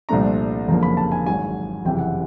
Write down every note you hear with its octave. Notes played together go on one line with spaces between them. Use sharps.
C2 A#2 F3 A3 D4 A#5
F#1 F2 D3 F3 A#3 A#5
B5
A5
G#5
G#1 G#2 D#3 F#3 G#5
F#1 F2 C3 E3 G5
F#5